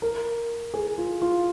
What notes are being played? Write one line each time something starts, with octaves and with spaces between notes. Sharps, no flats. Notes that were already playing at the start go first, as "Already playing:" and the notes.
A#4
G#4
F4
F4